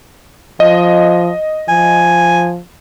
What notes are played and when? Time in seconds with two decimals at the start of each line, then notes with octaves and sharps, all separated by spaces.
0.60 F3 D#5
1.69 F3 G#5